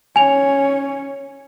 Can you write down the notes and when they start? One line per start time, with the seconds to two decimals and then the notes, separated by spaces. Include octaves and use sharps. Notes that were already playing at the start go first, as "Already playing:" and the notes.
0.16 C#4 C#5 G#5 F7